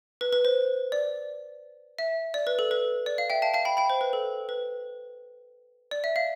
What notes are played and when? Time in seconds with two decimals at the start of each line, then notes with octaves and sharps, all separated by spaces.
0.21 B4
0.33 B4
0.45 C5
0.92 D5
1.99 E5
2.34 D5
2.47 B4
2.59 A4
2.71 B4
3.06 D5
3.18 F5
3.30 E5 G5
3.42 F5 A5
3.54 F5 A5
3.65 G5 B5
3.77 G5 B5
3.90 C5
4.01 B4
4.13 A4
4.49 B4
5.91 D5
6.04 E5
6.16 F5